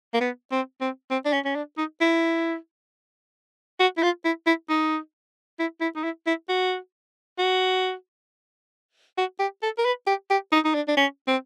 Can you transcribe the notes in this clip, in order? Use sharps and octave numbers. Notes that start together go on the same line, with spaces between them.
A#3
B3
C4
C4
C4
D4
C#4
C#4
D4
D#4
E4
F#4
E4
F4
E4
E4
D#4
E4
E4
D#4
E4
E4
F#4
F#4
F#4
G4
A4
A#4
B4
G4
G4
D#4
D#4
D4
D4
C#4
C4